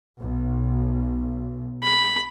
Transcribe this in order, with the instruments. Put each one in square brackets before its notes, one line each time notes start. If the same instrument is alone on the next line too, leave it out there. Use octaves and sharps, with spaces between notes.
[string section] B1
[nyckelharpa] B5